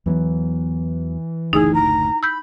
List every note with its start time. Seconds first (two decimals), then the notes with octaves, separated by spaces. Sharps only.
0.06 E2 E3 F#3 B3
1.53 F#1 D2 A2 D#4 E4 G#4
1.74 A#5
2.23 B5 E6 G6